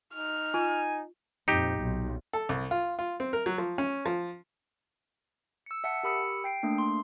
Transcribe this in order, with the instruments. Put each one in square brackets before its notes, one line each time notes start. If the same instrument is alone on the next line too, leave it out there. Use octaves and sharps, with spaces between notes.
[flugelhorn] D#4 [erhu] F6
[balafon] F4 [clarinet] G#5
[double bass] F2 A#2 [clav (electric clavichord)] D#4 G4
[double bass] B1
[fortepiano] A4
C2
F4
F4
C4
A#4
F#3
F3
C#4
F3
[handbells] E6 C#7
E5 F#5 A5 C#7
G4 A#4 B5 D#6 E6 C#7
G5 C7 D7
A3 A#3 D4 C7
C6